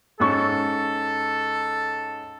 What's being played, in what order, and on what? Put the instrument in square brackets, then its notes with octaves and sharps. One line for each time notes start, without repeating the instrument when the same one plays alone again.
[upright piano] G#2 C#4 C#6 [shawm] A4